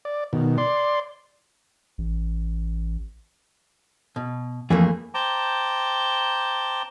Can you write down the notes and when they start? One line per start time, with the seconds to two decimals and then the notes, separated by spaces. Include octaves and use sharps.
0.05 D5
0.33 B2 D#3
0.58 D5 C6
1.98 A1
4.16 B2
4.70 F2 E3 A3 A#3 G#4
5.14 C5 G5 A5 A#5 D6